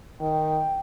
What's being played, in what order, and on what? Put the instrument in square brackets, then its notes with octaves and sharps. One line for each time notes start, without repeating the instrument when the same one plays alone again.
[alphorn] D#3 [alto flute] G5